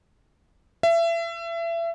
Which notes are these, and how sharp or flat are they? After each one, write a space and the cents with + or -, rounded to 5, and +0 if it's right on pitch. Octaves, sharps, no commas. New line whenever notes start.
E5 +30